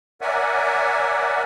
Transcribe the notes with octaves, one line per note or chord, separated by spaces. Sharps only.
A#4 C#5 D5 E5 F#5 G#5